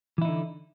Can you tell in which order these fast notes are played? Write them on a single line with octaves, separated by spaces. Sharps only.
E3 E4 D#4 D3